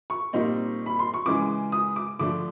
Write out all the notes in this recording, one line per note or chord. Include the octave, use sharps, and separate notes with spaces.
C#6
A#2 G3 C4 D#4
B5
C6
C#6
C#3 E3 G#3 D6
D#6
D6
D3 F3 A3 D4 D6